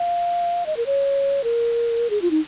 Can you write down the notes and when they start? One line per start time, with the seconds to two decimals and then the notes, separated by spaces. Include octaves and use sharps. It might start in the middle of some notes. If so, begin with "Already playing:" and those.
Already playing: F5
0.66 D#5
0.77 A#4
0.86 C#5
1.44 A#4
2.10 G#4
2.22 F4
2.31 D#4